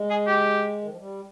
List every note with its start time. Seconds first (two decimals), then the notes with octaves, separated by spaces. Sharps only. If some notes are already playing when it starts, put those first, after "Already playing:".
Already playing: G#3
0.10 G#4
0.27 G4
0.82 D#3
0.89 F3
0.97 G3